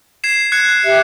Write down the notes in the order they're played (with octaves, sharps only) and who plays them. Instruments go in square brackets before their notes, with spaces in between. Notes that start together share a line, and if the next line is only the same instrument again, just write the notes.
[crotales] G#6 C7 E7
F#6 G#6 C#7
[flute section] G4 E5